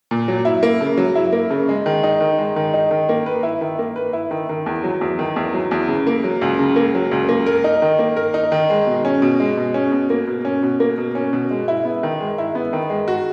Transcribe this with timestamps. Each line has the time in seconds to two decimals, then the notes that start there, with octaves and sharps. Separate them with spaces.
0.11 A#2
0.28 F#3
0.45 E4
0.63 A#3
0.81 C#3
0.97 F#3
1.15 E4
1.33 A#3
1.51 C#3
1.69 G#3
1.86 D#3
2.03 D#4
2.21 D#3
2.38 G#3
2.56 D#3
2.74 D#4
2.91 D#3
3.09 A#3
3.26 B4
3.43 E4
3.61 D#3
3.79 A#3
3.96 B4
4.13 E4
4.31 D#3
4.49 D#3
4.66 E2
4.84 F#3
5.01 E2
5.19 D#3
5.36 E2
5.54 F#3
5.71 E2
5.88 C#3
6.07 A#3
6.24 F#3
6.42 C#2
6.59 C#3
6.76 A#3
6.95 F#3
7.12 C#2
7.29 A#3
7.46 A#4
7.64 D#4
7.82 D#3
7.99 A#3
8.16 A#4
8.34 D#4
8.52 D#3
8.70 G#3
8.87 B2
9.05 C#4
9.22 B2
9.40 G#3
9.57 B2
9.74 C#4
9.92 B2
10.10 A#3
10.27 B2
10.45 C#4
10.63 B2
10.80 A#3
10.98 B2
11.15 C#4
11.33 B2
11.51 G#3
11.68 E4
11.85 B3
12.03 D#3
12.20 G#3
12.38 E4
12.55 B3
12.73 D#3
12.90 G#3
13.08 F#4